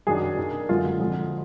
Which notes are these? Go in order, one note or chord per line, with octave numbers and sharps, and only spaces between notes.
F#2 D#3 F#3 D4 G#4
D#3 A#3 D4
F#2 D3 G#3 F4
F2 D3 F3 G#3